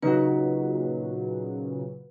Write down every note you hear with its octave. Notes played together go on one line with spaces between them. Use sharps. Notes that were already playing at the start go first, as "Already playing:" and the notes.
A#2 C#3 F#3 D#4 F#4 B4